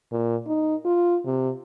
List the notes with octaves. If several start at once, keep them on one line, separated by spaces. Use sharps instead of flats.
A#2
D#4
F4
C3